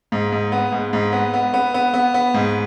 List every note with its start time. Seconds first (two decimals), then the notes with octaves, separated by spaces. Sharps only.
0.12 G#2
0.32 G#2
0.52 B3
0.72 G#2
0.93 G#2
1.12 B3
1.34 B3
1.54 B3
1.74 B3
1.94 B3
2.14 B3
2.34 G#2